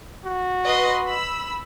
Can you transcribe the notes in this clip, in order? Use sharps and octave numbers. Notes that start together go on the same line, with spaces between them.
F#4
B4 D#5 C6
B5 E6